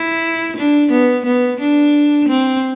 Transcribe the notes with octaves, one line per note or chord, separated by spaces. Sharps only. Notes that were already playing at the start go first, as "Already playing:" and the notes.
Already playing: E4
D4
B3
B3
D4
C4